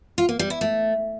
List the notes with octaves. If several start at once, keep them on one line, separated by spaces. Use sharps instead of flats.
F4
A#3
G3
E4
A3